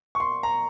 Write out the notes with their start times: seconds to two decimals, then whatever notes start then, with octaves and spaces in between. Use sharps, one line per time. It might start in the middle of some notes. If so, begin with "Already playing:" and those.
0.15 C#6
0.20 C6
0.43 A#5